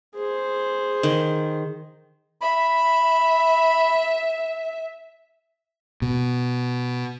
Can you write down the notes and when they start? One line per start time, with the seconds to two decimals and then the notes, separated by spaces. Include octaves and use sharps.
0.16 G#4 C5
1.03 D#3
2.41 E5 B5
6.02 B2